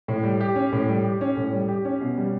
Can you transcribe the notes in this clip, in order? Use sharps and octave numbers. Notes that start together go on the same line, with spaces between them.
A2
G3
G4
C#4
A2
G3
G4
C#4
A2
G3
G4
C#4
B2
G3